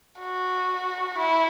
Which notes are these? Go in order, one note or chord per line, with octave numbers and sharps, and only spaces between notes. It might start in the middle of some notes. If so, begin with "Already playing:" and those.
F#4
E4